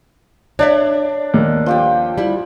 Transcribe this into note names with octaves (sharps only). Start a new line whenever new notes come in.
D4 C#5 D5 E5
D#2
F3 G4 G5
G3 E4